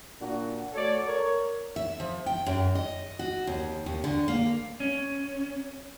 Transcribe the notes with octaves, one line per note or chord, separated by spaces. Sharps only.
A#2 D4 F#4
A3 F#4 A4 C#5 D5
A#4 C#5
E5
F3
G5
F#2
D#5
F#4
D#2
D#2
D3
A#3
C#4